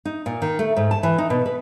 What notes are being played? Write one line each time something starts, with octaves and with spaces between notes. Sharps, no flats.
D#4
A#2
D#3
A3
G#2
A5
E3
D#4
B2
B4